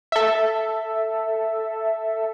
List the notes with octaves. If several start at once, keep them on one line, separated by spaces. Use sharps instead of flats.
A4 E5